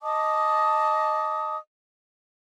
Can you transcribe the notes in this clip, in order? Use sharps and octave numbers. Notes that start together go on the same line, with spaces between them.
D#5 A5 D6 D#6